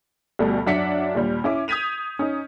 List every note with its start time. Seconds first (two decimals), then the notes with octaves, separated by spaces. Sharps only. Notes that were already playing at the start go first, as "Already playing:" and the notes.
0.39 D2 B2 G3 A3
0.67 F#2 D4 E5 F#5 B6 C#7
1.15 D#2 A#2 G3
1.44 C#4 E4 D6
1.68 D#6 G6 G#6 B6 D#7 F7
2.19 C#4 D#4